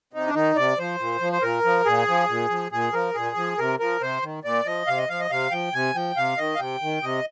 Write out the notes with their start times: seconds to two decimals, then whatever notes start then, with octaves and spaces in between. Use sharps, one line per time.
0.13 C3 D#4
0.27 D4
0.34 D#3 D#4
0.56 C3 D5
0.79 F3 C5
1.00 A#2
1.21 F3
1.33 C5
1.42 A#2 A#4
1.65 F3
1.86 A#2 G#4
2.08 F3
2.29 A#2
2.50 F3
2.72 A#2 G#4
2.93 F3 A#4
3.15 A#2 G#4
3.37 F3
3.58 C3 A#4
3.80 F3 A#4
4.01 C3 C5
4.22 D#3
4.44 A#2 D5
4.66 F3 D#5
4.87 C3 F5
4.98 D#5
5.09 F3 F5
5.20 D#5
5.31 C3 F5
5.51 F3 G5
5.74 C3 G#5
5.95 F3 G5
6.17 C3 F5
6.38 D#3 D#5
6.55 F5
6.59 C3 G5
6.82 D#3
7.03 C3 D#5